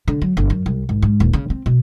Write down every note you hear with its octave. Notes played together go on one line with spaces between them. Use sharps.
D3
F#3
G1
F#2
C2
G#1
G#2
D#1
C#3
C4
B2